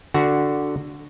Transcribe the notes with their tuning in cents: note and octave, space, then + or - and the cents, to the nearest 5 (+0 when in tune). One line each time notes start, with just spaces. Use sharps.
D3 +0 F#4 +0